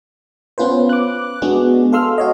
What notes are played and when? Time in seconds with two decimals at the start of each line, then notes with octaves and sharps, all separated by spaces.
0.58 B3 C#4 F4 B4 C5
0.89 D6 F#6
1.42 G#3 B3 D4 F#4 G#4
1.92 A4 F5 C6 E6 F6
2.18 F#4 C#5 D#5